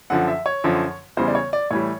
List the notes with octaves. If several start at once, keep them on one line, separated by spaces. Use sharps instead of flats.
F#2 D3 F3 F#5
E5
C#5
F#2 D3 F3
E2 C#3 E3 G3 C5
D5
C#5
D5
A2 E3 G3 C#5